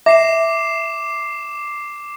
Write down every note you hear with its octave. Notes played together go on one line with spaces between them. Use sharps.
E5 D6 C7 E7